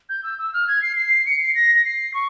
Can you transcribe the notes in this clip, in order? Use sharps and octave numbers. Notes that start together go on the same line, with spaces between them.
G6
E6
E6
F6
G#6
C7
C7
C#7
C7
A#6
A#6
C7
C#6